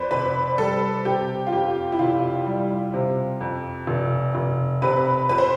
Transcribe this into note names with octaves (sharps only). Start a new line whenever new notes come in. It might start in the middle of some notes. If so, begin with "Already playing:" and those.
Already playing: F2 B4 C5 D5
F1 B4
G3 A4
C3 G4
F4
F2 G4
E4
F1 F4
G3
C3
F2
F1
F1
C3 B4
F2 B4
C5